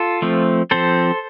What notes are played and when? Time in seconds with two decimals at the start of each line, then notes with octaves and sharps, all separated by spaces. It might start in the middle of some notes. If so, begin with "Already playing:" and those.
Already playing: F4 A4
0.22 F3 A3 C4
0.71 F3 C4 A4 C5